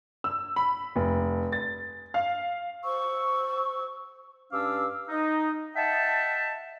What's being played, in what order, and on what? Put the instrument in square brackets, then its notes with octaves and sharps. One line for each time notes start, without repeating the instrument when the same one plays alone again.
[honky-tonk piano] E6
B5
F1
A6
F5
[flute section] C5 C#6 E6
[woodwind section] G2 C#4 D4 F5 D6 E6
D#4
D#5 E5 F#5 G5 A5